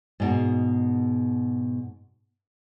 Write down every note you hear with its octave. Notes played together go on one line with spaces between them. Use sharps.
G#2 B2